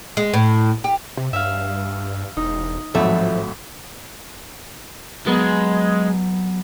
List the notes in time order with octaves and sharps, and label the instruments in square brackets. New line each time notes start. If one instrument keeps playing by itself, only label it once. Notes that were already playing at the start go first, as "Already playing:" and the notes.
[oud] G#3
A2
G4
[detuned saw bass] C3
[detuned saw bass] G2 [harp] E5 F5
[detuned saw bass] E1 [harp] D#4
[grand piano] G#1 A2 F#3 [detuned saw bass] F3 [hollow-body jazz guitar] A3 [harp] B5
[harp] F#3 B3 [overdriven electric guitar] G#3